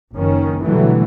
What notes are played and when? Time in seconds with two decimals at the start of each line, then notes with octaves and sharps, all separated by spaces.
0.14 F#1 D#3 C#4
0.65 B2 D3 E3 F#3 G3 A3